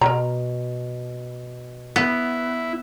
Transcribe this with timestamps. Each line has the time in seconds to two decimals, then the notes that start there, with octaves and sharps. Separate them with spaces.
0.01 B2 A#4 A#5
1.96 B3 E4